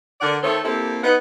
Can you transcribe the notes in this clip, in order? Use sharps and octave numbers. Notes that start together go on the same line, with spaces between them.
D3 A#4 D5 F#5
D#3 A3 A4 C5 C#5
A#3 C4 E4 G4 A4
B3 D#4 B4 F#5